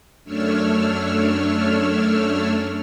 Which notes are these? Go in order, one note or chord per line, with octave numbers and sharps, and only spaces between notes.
F#2 A3 D4 C#5 E6 F6